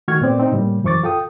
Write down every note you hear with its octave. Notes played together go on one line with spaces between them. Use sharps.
D#3 A3 F#4 C#6 F6 G#6
A#2 A3 B3 C4 D5
C4 D#4
A2 C#3 G3 A#3
F#2 E3 C5 C#6 D6 A6
F4 A4 G5 D#6